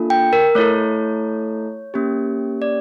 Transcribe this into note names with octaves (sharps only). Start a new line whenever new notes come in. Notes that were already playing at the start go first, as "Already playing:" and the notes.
Already playing: A#3 D4 F4 A4
G5
A#4
A3 E4 A4 C#5
A#3 C#4 G4
D5